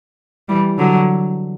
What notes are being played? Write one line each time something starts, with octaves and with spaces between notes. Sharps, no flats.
E3 G3
D3 F#3